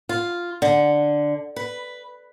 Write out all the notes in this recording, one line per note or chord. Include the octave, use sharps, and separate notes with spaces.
F4
D3
B4